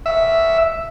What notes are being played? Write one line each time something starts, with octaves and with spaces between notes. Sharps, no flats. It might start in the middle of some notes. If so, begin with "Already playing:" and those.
E5